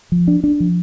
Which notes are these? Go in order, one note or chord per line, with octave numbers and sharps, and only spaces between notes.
F3
D4
D4
F3